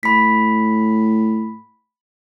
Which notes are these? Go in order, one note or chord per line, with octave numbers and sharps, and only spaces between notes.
A2 B5 B6